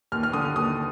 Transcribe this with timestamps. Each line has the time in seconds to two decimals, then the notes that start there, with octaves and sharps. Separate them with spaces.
0.12 D#2 F6
0.23 F6
0.33 D3 D#6
0.45 F6
0.55 D#2 D#6